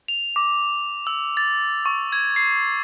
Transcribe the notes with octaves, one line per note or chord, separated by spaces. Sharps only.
F7
D6
E6
A6
C#6
G#6
C7